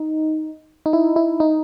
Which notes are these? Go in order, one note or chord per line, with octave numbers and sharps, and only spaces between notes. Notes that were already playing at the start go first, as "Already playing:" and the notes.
Already playing: D#4
D#4
E4
E4
D#4